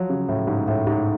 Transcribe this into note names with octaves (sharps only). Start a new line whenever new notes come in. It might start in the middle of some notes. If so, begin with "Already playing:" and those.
Already playing: F3 F#3
C#3
A2
G#2
A2
G#2